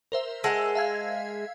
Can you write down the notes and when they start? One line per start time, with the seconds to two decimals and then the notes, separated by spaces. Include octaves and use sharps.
0.12 A#4 C5 E5
0.44 G#3 F#5 A5 E6
0.75 E5 F5 G#6